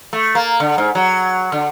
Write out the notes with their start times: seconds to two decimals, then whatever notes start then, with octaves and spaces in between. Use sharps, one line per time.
0.13 A3
0.35 A#3
0.60 D3
0.78 G#2
0.95 F#3
1.52 D3